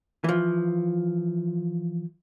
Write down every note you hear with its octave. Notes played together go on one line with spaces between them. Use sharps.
E3 F3